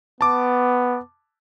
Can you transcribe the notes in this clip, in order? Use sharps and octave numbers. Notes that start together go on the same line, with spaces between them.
B3 A5 D6